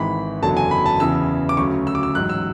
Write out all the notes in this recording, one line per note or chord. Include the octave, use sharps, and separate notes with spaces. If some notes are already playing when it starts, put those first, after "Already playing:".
Already playing: G#1 G#2 E3 B5
F#1 E2 D3 F#3 A5
G#5
B5
A5
E2 C#3 E3 E6
D6
D2 C#3 F#3 C#6
E6
D6
E6
A1 G#2 F#3 F#6
E6